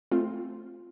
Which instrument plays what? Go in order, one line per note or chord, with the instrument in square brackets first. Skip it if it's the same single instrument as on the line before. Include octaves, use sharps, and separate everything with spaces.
[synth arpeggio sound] A3 C4 F4